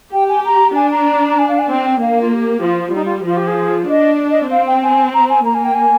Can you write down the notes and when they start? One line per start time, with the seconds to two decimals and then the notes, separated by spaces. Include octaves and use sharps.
0.12 G4 G5
0.28 G#5
0.45 A#5
0.75 D4 G#5
0.91 A#5
1.30 A#5
1.38 G#5
1.48 F5
1.59 G#5
1.69 C4 G5
1.85 G5
2.01 A#3 F5
2.21 F4
2.32 G4
2.58 G4
2.63 F3 F4
2.78 F4
2.89 F4
2.95 G3 D#4
3.05 F4
3.26 F3 F4
3.37 G4
3.47 G#4
3.88 D4 D#5
4.30 D#5
4.51 C4 F5
4.67 G5
4.83 G#5
5.14 A#5
5.29 G#5
5.45 A#3 A#5
5.54 G#5
5.64 G5
5.74 G#5